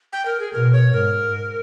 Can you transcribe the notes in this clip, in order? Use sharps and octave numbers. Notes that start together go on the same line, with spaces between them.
G5
A#4
G#4
B2 A#4
C#5
G#2 A#4